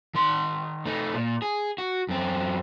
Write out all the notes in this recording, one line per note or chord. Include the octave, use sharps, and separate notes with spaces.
D#3 C6
A3 D#4
A#2
G#4
F#4
F#2 C4